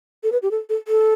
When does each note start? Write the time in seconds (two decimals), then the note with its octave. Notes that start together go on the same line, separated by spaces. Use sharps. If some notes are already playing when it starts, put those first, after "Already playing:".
0.24 A4
0.32 B4
0.42 G4
0.51 A4
0.69 A4
0.88 A4